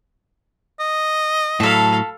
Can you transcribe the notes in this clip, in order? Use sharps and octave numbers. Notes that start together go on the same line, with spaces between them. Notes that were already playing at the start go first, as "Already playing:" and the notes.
D#5
A2 F#3 A4 F5 A5 B5